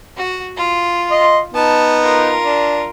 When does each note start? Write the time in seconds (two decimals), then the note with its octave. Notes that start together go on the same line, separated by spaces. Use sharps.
0.17 F#4
0.57 F4
1.11 D#5 C6
1.54 B3 D#4 A5
2.03 F4 A#4
2.43 D4